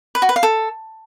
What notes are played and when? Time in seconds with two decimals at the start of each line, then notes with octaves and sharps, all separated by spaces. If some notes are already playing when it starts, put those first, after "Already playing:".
0.15 B4
0.22 F#4
0.29 B4
0.36 F5
0.43 A4